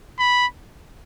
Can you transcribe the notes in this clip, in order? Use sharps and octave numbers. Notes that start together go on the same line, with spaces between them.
B5